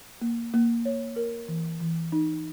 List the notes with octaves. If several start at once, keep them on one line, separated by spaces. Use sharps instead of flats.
A#3
A#3
C#5
A#4
E3
E3
D#4